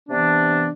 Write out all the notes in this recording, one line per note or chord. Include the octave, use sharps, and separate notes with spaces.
C3 E3 B3 D4